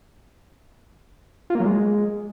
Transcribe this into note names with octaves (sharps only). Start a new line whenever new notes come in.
F4
A#3
F#3
G#3